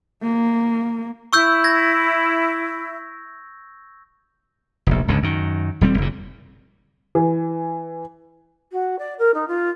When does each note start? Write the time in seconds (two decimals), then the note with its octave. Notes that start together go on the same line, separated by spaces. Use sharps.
0.23 A#3
1.33 E4 C#6 E6 G6
1.64 G#6 A#6
4.87 F1 A#1
5.08 C#2 G#2 D3
5.23 F#2 D#3
5.81 D#1 G3 C4
5.98 F#1 A#2
7.15 E3
8.72 F#4
8.99 D5
9.19 A#4
9.34 D#4
9.48 F4